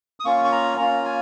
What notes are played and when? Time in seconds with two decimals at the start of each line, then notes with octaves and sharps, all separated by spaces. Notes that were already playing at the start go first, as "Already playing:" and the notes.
0.20 D#6
0.25 A#3 C#4 F4 C#6
0.45 C#6
0.52 A#5
0.78 A#3 C#4 F4 A#5
1.05 G#5